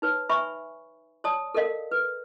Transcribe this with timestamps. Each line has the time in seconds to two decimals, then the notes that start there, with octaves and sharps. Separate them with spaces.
0.02 D#4 B4 C#5
0.29 B4 E5 G#5 B5 C#6
1.24 C#5 D5 A5 D#6
1.54 A4 A#4 D5 D#5 F5
1.91 B4